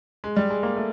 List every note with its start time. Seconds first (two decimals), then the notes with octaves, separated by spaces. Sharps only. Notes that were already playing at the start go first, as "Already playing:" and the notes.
0.24 G#3
0.36 G3
0.50 G#3
0.63 A#3
0.76 A3